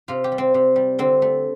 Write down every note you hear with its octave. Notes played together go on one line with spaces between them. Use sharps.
C3 F4
G4
G3
C4
C3
G3
D3 C4
A3